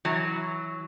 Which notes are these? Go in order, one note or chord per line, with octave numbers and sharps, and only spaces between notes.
E3 F#3